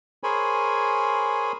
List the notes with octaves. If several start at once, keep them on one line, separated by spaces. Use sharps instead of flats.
G#4 A#4 C5 C#5 G#5 B5